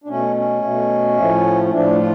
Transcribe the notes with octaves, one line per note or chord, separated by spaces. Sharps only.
D4
B2 A3 C#4
C#4
B2 A3
A2 F3 A3
A2 F3 A3 D4
F4